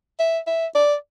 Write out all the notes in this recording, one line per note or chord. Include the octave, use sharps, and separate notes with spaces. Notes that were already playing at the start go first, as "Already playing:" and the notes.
E5
E5
D5